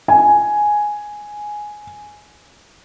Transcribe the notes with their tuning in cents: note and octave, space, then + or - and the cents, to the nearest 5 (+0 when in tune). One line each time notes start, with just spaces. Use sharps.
G#5 +5